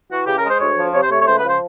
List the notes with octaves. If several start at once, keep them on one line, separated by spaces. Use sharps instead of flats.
E3 F#4
C#3 G4
A#4
G#3
C5
D2 C#5
F3
C3 C#5
C5
A3 C#5
C#5
C#2 C5
B4
F3
C5